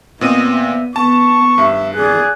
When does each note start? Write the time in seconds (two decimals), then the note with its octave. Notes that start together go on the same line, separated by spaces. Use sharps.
0.21 A#2 B3 C4 D#5 D#7
0.52 E5
0.96 B3 A5 C#6
1.58 G2 E5
1.95 G#4 D5 F#6